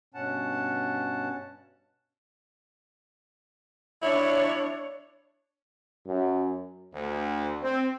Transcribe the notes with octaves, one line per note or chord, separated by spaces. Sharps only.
G2 B2 C#4 F#5 A5
D4 E4 C#5
F#2
D2
C4